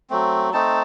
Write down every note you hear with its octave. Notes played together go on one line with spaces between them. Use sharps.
F#3 A3 C4
A3 C4 D#4 A5